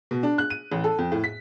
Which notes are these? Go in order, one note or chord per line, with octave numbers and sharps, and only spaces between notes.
B2
D4
F#6
D#7
A1
A4
F2
A2
B6